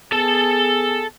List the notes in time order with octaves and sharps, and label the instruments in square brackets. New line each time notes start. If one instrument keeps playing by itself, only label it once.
[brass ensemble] B3 G#4 [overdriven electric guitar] A4 A5